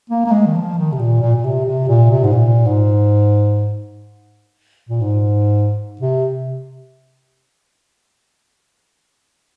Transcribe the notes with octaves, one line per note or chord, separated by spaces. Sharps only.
A#3
A#3
G#3
D#3
F3
D#3
C3
A#2
A#2
A#2
C3
C3
A#2
C3
G#2
A#2
G#2
A#2
G#2
C3